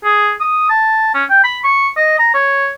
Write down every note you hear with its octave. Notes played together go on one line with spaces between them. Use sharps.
G#4
D#6
A5
C#4
G5
B5
C#6
D#5
A#5
C#5